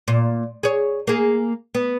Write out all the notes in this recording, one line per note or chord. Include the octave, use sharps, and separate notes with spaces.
A#2
G#4 C#5
A#3 G#4
B3